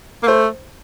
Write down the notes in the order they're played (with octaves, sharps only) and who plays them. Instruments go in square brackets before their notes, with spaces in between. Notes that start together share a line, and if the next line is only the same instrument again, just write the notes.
[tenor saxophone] A#3
[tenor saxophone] A3 [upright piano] C5